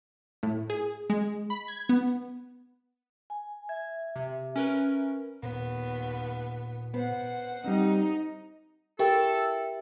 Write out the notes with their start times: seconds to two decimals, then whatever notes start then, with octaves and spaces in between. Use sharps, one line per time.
0.43 A2
0.70 G#4
1.10 G#3
1.50 B5
1.68 G#6
1.89 B3
3.30 G#5
3.69 E5 G#6
4.16 C3
4.56 C#4 A#4 B4
5.43 D#2 A#2 B3
6.94 B3 C5 F#5
7.64 G3 C4 D#4
8.99 E4 G4 A4 A#4 G5